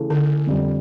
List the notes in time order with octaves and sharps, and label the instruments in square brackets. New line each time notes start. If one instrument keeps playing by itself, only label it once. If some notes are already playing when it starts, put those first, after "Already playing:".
Already playing: [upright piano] C#3 E3 A3
[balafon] D3
[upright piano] F2 D3 G3